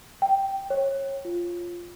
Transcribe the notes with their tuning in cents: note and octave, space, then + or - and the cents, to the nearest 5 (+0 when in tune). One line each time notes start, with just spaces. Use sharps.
G5 -5
C#5 -25
F4 +0